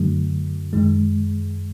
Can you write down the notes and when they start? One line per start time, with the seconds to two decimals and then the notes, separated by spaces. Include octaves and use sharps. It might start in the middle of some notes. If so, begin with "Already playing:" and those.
Already playing: F#2 D3 F#3 A3
0.73 F#2 D#3 G#3